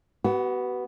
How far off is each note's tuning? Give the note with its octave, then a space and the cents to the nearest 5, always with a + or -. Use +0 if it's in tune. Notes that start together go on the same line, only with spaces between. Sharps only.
B3 +0 F#4 +40